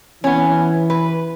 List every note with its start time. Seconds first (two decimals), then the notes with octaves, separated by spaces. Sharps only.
0.24 E3 B3 C#4
0.90 B4